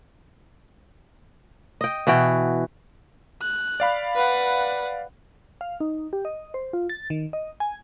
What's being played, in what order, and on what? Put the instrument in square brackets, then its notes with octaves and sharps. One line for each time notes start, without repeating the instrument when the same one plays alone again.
[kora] D#5 G5
B2 E3 F#4 G5
[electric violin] F#6
[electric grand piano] D5 F5 B5
[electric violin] B4 F#5
[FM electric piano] F5
D#4
G4
D#5
C5
F4
A6
D#3
D#5
G#5